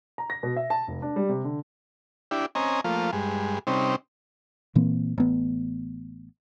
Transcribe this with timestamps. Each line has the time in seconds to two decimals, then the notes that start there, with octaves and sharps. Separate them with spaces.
0.18 A#5
0.30 A#6
0.43 B2
0.56 E5
0.70 A5
0.88 F1
1.02 D4
1.16 G3
1.29 C3
1.44 D3
2.31 D4 E4 G4
2.55 C4 C#4 D#5 G#5 A#5
2.84 F3 A3 A#3 F4
3.13 G2 G#3
3.67 C3 G3 C4 C#4 D#4
4.75 A#2 E3 A#3 C4
5.18 A1 B3